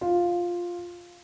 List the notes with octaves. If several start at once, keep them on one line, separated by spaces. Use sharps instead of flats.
F4